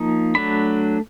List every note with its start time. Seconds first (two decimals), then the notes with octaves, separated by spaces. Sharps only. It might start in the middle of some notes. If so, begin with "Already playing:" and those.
Already playing: F3 A#3 D#4
0.35 F#3 A3 D4 B5